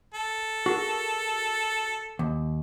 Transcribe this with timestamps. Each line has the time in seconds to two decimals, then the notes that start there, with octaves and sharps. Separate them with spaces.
0.14 A4
0.66 F#4 G#4 A#4
2.19 D#2